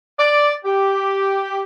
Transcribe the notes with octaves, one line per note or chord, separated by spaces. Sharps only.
D5
G4